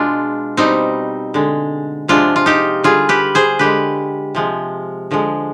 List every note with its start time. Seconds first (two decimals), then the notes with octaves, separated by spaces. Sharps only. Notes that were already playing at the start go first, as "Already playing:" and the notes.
Already playing: B2 G#3 D4 F4
0.57 B2 G3 C4 D#4
1.34 D3 G#3
2.08 C3 F3 G#3 D4 F4
2.36 F4
2.46 D#4 G4
2.84 D3 G3 F4 G#4
3.09 G4 B4
3.35 G#4 C5
3.59 D3 G#3 G4 B4
4.35 C3 F3 G#3
5.11 D3 F3 G#3